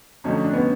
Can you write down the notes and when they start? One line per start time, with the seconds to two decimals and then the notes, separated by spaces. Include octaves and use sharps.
0.24 F2 D3 F#3 A3 C#4 D#4
0.44 D4
0.53 B3 C#4